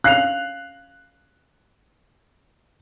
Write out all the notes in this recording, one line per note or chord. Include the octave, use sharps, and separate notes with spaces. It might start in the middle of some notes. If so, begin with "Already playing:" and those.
C#4 F5 F#6 C7 F7